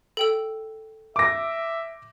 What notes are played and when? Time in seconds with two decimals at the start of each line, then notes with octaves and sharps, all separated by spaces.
0.17 A4 G5 E6
1.16 E5 D6 A#6